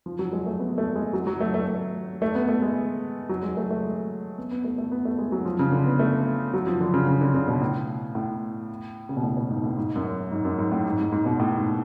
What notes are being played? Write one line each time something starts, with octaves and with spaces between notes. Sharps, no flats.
F3
F#3
G#3
A3
B3
A3
G#3
F#3
F#3
A3
A3
A3
A3
B3
A3
G#3
F#3
G#3
A3
A3
G#3
B3
B3
A3
A3
B3
A3
G#3
F#3
F3
C#3
D3
B3
A3
F#3
F3
D3
C#3
C#3
D3
C#3
B2
A2
A2
C#3
B2
A2
B2
G#2
A2
G#2
F#2
G#2
F#2
G#2
A2
G#2
G#2
G#2
B2
A2
G#2